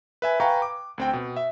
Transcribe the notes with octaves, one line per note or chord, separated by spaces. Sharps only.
B4 E5 G#5
B4 F5 G5 G#5 A#5 C#6
D6
D2 C4 G5
B2
E5